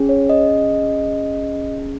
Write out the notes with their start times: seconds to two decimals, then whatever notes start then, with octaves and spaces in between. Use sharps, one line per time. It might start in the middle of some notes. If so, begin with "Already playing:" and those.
Already playing: C#4 G#4
0.09 C#5
0.29 D#5